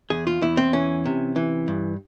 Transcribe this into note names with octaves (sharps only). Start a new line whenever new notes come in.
E2 G#4
F4
E2 E4
C4
E3 C#4
C3
E3
G2